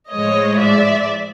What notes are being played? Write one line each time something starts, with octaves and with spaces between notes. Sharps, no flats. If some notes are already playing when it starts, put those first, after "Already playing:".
A2 F3 G#3 C#5 D#5
D5 E5